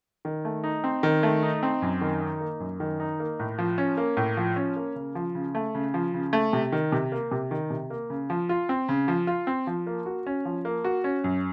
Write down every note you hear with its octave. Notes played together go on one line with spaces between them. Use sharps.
D#3
A3
D#4
C4
D#3
A3
D#4
C4
F#2
D#3
D#4
A#3
F#2
D#3
D#4
A#3
A2
F3
C#4
A#3
A2
F3
C#4
A#3
C#3
F3
C#3
A3
C#3
F3
C#3
A3
C3
D#3
C3
A#3
C3
D#3
C3
A#3
C#3
F3
F4
C4
C#3
F3
F4
C4
F3
A#3
F#4
C#4
F3
A#3
F#4
C#4
F#2